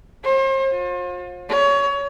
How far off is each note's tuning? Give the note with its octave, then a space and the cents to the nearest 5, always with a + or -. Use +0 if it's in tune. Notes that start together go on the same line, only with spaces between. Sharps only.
C5 +40
F4 +40
C#5 +25